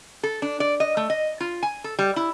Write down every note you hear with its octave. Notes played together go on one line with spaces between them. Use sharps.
A4
D4
D5
D#5
A3
D#5
F4
G#5
A4
G3
E4